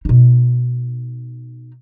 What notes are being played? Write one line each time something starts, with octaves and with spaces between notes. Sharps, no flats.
B2 D#4